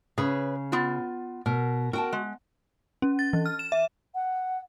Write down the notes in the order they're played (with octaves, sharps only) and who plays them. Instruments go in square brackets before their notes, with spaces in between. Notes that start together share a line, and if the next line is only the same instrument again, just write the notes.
[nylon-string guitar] C#3 [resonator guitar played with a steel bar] G#4 B4 C#5
[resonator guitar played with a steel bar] B3 F4
[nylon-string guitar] B2 [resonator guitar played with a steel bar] A#4
[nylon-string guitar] F#4 [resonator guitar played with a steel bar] A#4 G5 A5
[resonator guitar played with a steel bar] G#3
[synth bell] C#4
A6
E3
F6
E7
E5
[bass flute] F#5